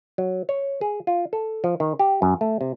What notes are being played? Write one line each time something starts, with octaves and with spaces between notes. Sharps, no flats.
F#3
C#5
G#4
F4
A4
F3
D#3
G4
F#2
A3
C3